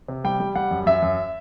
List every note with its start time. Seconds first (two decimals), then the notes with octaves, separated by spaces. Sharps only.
0.08 C3
0.24 G3 G5
0.40 G3
0.55 G3 F#5
0.71 F#2
0.86 F#2 E5
1.02 F#2